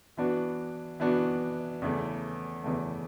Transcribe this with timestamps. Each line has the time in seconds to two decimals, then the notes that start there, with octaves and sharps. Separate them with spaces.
0.17 E3 B3 D4 F#4
1.00 E3 B3 D4 F#4
1.82 E2 C#3 E3 A3
2.64 E2 C#3 E3 A3